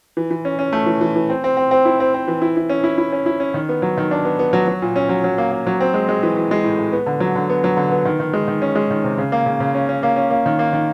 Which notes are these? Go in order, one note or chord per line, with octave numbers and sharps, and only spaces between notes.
E3
E3
C#4
C#4
A3
E3
E3
E3
C4
C4
C4
C4
E4
C4
C4
E3
E4
E4
C#4
E4
E4
C#4
E4
C#4
D#3
B3
F#3
D#3
D4
B3
B3
F#3
F#3
A#2
C#4
F#3
F#3
A#3
A#3
F#3
C4
G#3
G#3
E3
E3
G#3
A2
A2
B3
D3
F#3
D3
B3
F#3
D3
B3
D#3
D#3
G#3
D#3
C#4
G#3
D#3
C3
C#3
A#3
C#3
C#3
C#4
C#4
A#3
C#4
A#3
D#3
A#3
D#3